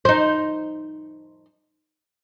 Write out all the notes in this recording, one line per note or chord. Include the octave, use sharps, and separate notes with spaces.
D#4 C5